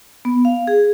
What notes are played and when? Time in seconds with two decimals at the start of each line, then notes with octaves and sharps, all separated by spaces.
0.25 B3
0.45 F5
0.67 G#4